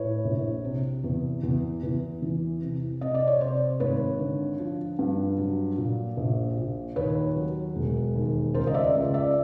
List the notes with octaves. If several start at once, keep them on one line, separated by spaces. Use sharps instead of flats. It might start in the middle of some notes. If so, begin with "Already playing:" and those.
Already playing: A2 B4 C#5
A#1
C3
E2
E2
E2
E3
C3
C3 D#5
D5
C#5
C3 C5 D5
G#1 B4 C#5
D3
F3
G2
F#3
A#2
A#1
A#2
D#2 B4 C#5
F#3
E1
D#2
C#2 A#4 C5
D#5
D5 E5
C#2
D5 E5